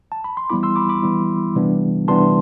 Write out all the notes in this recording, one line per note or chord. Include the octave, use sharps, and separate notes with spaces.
A5
B5
C6
E3 G3 B3 E4 B5 D6
C6 E6
B5 D6
B5 D6
E3 G3 B3 E4
C3 E3 G3 B3 D4
C3 E3 G3 B3 D4 A5 C6